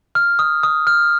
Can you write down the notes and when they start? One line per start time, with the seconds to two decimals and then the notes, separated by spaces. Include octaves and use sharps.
0.15 F6
0.39 D#6
0.63 D#6
0.87 F6